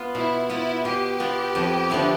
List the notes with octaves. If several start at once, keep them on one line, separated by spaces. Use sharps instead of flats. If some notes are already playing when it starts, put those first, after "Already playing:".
Already playing: B3 F4
B2 E4
B3 E4 F4
B2 G4
B3 F4
F2
D3 F3 B3 E4